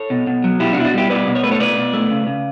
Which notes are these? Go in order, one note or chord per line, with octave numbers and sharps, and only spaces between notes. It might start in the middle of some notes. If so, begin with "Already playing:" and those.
Already playing: A4 C#5
B2
B2
F#3
B2 E4 G4
D4 F#4
B2 E4
D4 F#4
G3 E4 G4
B2 B4 D5
B2
C#5
A3 B4
A4 C#5
B2 B4 D5
B2
A3
C#3
C#3